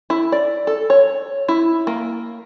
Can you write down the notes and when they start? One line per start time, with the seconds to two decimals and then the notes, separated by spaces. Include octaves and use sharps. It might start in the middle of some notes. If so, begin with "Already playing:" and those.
0.10 E4
0.32 D5
0.67 A4
0.90 C#5
1.48 E4
1.87 A#3